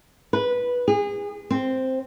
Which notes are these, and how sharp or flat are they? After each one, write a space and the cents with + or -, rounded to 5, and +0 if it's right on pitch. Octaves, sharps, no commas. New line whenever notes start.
B4 -10
G#4 -30
C4 +0